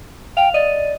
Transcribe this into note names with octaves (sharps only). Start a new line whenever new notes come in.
F5 G5
D5 D#5